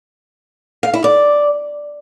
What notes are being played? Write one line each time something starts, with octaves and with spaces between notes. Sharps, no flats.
F5
E4
D5